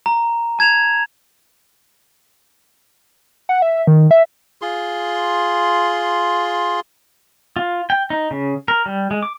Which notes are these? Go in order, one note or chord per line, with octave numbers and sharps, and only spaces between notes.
A#5
A5 G#6 E7 F7
F#5
E5
D#3
E5
F4 G#4 C6
F4
G5
D#4
C#3
A#4
G3
G#3
D6